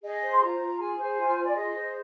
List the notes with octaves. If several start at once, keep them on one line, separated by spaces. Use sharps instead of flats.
G#4 D#5
C5
C6
F4 A#5
F4
G#4 G#5
C5
F4
F4
D5
G#4 D#5
C5